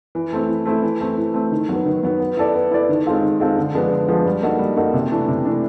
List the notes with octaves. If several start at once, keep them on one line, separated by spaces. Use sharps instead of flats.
E3
A3 C4 E4
E3
A3 C4 E4
E3
A3 C4
E3
A3 C4
D#3
F#3 B3
D#3
F#3 B3
B3
E4 A4 D5
B3
E4 A4 D5
D#3
G#3 C4 F4 A4
D#3
G#3 C4 F4 A4
D3
F3 G#3 B3 D4
D3
F3 G#3 B3 D4
G3
A#3 D#4 F#4 A4
G3
A#3 D#4 F#4 A4
C3
E3 A3 D4
C3
E3 A3 D4